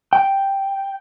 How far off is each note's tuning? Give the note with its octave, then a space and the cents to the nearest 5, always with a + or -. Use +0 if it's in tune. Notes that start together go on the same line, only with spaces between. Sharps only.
G5 +0